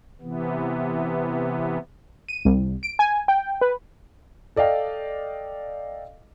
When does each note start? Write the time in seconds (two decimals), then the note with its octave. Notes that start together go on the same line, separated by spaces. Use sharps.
0.21 C3 E3 B3
2.29 D#7
2.45 C2
2.83 D7
2.99 G#5
3.28 G5
3.61 B4
4.56 A4 D5 D#5 F5 G5